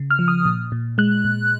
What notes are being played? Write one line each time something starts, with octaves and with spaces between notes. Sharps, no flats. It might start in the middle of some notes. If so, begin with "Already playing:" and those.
Already playing: C#3
F6
F3
D#6
A#2
A#2
G#3 F#6
A#2